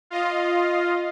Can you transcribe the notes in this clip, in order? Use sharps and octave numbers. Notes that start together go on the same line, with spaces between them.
F4 D#5 F5